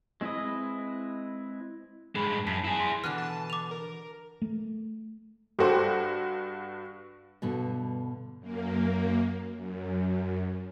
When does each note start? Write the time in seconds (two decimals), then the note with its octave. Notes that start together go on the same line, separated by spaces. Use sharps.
0.21 G#3 C4 E4 B4 D#5
2.15 G2 G#3 G#4 B5
2.47 F#2 A5 B6 C7
2.64 E4 G#4
2.80 C6
3.04 B2 D3 E3 F6 F#6
3.18 A5
3.50 D6 F7
3.71 A#4
4.42 A3
5.59 G2 F#4 G4 A4 C5
7.42 G2 B2 D3
8.39 F#2 A#3
9.54 F#2